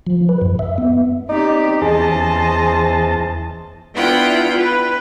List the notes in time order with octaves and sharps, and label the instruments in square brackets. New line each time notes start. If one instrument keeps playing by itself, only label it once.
[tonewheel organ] F3
B4
F#2
E5
B3
[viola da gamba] C4 C#4 G4 [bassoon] D#4 [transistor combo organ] D5
[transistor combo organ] E2 A5 [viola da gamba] C#4 C5 D#5 [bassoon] G#4
[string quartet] B3 D4 E4 F4 F#5 G5
B4